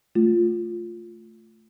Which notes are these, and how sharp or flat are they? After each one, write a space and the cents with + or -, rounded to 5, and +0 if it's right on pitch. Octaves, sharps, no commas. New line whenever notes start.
A3 +0 F4 +0